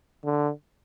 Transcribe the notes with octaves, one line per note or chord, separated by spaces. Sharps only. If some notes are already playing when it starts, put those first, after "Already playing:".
D3